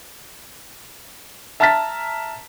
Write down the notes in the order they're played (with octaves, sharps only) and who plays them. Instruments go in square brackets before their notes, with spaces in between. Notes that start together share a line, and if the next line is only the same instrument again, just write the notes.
[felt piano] E5 A5 A#5 F6 A6 B6